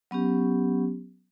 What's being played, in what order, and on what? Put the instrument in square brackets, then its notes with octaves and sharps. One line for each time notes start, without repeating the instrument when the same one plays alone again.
[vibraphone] F#3 B3 C#4 G4